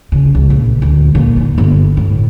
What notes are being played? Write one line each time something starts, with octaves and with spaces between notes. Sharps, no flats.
C#3
C#2
A#1
D2
A#2
D#4
G1
A2